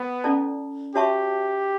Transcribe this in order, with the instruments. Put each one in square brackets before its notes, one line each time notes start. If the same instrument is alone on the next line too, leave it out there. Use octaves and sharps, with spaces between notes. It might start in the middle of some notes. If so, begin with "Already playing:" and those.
Already playing: [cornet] B3
[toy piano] C#4 E4 A4 D5 A5
[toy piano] F#4 C#5 E5 A5 C#6 [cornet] G4